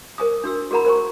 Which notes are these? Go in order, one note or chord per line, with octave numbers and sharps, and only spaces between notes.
A#4 C5 G#5 D6 D#6
D4 F#4 E6
F#4 G#4 A#4 F#5 A#5 B5
A#4 C5 G#5 C#6